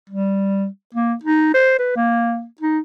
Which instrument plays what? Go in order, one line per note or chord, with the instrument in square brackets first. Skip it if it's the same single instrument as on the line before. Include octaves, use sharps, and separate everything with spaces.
[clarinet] G3
A#3
D#4
C5
B4
A#3
D#4